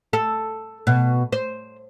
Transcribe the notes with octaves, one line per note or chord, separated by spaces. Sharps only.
A4
B2
C5